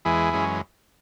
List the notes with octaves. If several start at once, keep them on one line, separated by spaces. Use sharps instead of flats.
E2 E3 G#3 E4 G#4
F#2 E3 G#3 C#4